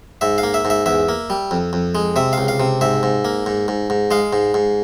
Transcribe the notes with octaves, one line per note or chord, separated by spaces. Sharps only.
G#2 E5
F5
A#3
E5
G#2
E5
E2 E5
A#3
G3
F2
F2
G#3
C3 E5
C#2 F5
F5
C3
G#2 E5
G#2
A#3
G#2
G#2
G#2
G#3 F5
G#2
G#2